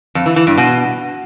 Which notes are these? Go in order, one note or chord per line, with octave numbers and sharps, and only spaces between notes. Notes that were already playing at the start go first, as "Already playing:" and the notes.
F2
E3
E3
G2
B2